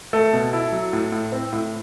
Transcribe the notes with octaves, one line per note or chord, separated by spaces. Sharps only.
A3 A4
B2
E4
F#3
A2
A2
C4
A2